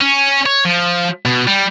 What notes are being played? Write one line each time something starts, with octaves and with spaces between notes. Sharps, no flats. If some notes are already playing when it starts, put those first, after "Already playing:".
C#4
C#5
F3
B2
G3